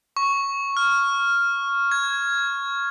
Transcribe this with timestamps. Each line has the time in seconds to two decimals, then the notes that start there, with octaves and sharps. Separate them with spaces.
0.17 C#6
0.77 F6
1.92 G#6